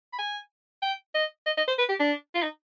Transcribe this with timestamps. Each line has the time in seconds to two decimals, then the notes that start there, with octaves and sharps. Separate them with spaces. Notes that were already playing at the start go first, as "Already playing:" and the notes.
0.13 B5
0.18 G#5
0.83 G5
1.15 D#5
1.46 D#5
1.57 D#5
1.68 C5
1.78 B4
1.89 G4
2.00 D4
2.35 F4
2.43 D#4